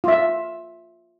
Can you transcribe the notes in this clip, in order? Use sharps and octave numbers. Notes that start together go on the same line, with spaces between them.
F4 E5